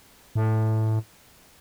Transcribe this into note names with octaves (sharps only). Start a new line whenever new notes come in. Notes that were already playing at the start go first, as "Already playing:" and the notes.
A2